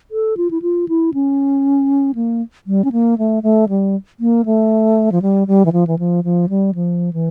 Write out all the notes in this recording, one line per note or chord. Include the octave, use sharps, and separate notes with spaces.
A4
F4
E4
F4
E4
C#4
A#3
G3
C#4
A#3
A3
A3
G3
A#3
A3
F3
G3
G3
E3
F3
E3
F3
F3
G3
F3
E3